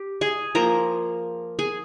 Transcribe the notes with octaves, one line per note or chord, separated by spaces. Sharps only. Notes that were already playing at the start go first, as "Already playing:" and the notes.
Already playing: G4
G#4 G#5
F3 A#3 A#4 A#5
G#4 G#5